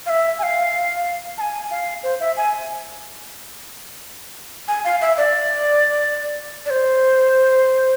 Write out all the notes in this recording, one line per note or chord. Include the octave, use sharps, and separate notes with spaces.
F5
E5
G#5
F5
A5
G#5
F5
C5
E5
G#5
G#5
F5
E5
D5
D5
C5